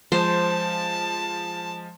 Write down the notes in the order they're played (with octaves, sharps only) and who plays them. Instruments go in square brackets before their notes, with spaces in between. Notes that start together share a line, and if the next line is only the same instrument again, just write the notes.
[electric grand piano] F3 G#3 [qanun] C5 [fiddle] A5